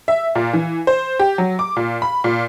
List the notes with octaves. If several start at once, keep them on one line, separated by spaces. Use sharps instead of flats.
E5
A#2
E3
C5
G4
F#3
D6
A#2
B5
A#2